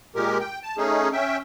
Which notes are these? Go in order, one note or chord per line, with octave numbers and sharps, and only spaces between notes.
A#2 G#3 G4 A#4
G5
A5
A3 C#4 D#4 G#4
C#4 E5 G5